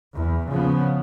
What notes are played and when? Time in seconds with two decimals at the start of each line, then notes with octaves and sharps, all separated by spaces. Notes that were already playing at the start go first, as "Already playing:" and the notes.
0.15 E2
0.50 C#3 F3 B3